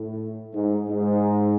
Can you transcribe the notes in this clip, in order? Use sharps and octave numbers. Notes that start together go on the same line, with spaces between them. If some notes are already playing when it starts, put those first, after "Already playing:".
Already playing: A2
G#2
G#2